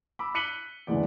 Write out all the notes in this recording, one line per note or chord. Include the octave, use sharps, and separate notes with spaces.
B5 D6 E6
F#6 B6 C#7 D#7 F#7 G7
F#1 D2 E3 G#3 D5